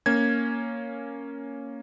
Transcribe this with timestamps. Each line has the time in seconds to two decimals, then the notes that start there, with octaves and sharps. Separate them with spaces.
0.06 A#3 C#4 G#6